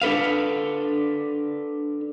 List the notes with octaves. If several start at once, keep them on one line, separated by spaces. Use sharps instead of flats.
D4 A4 B4 F5